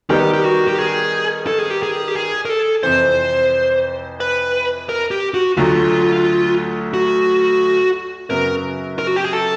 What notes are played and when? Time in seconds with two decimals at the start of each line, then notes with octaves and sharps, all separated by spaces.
0.10 D#3 G3 B3 D#4 G4
0.33 G4
0.44 F#4
0.67 G4
0.78 G#4
1.47 A4
1.59 G#4
1.70 G4
1.83 G#4
2.08 G4
2.15 G#4
2.45 A#4
2.49 A4
2.83 F2 C3 E3 C5
4.20 B4
4.89 A#4
5.11 G4
5.34 F#4
5.57 D2 D3 F#3 A3 F4
6.94 F#4
8.30 F#2 C#3 F#3 B3 A#4
8.99 A#4
9.07 F#4
9.16 G4
9.25 G#4
9.33 A4